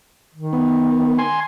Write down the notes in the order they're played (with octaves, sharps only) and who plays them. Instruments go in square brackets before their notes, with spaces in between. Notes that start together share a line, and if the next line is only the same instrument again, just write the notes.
[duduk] D#3
[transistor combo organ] B3
G#5 C6